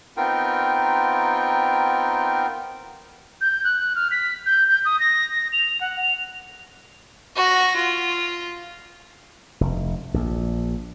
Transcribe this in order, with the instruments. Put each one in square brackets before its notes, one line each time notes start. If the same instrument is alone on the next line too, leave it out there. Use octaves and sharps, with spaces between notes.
[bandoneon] B3 C4 D#4 F4 A#4 G5
[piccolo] G6
F#6
F6
B6
G6
G6
D#6
A#6
A#6
F7
F#5
F7
[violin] F#4 A#6
F4
[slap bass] F1
A#1